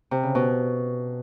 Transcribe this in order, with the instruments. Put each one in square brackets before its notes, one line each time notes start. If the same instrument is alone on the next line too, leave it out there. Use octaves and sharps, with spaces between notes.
[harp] C3
C#3
B2